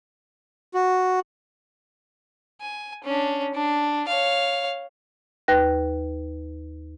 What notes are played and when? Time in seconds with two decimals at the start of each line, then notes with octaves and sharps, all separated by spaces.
0.74 F#4
2.61 G#5
3.04 C#4 D4
3.54 D4
4.08 C#5 F5
5.48 D#2 B4 F#6 A#6